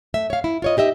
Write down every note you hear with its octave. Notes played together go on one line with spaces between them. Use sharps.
A3 E5
C#5 F5
E4
F4 C#5 D#5
D#4 G4 D#5 E5